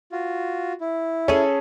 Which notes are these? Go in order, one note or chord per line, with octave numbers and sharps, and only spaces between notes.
F4 F#4
E4
C#4 G#4 A4